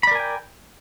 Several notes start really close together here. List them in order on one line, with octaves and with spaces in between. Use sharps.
B5 D5 A#4 G#5 G5